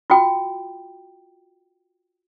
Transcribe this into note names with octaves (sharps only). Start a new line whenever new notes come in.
F4 F#4 G5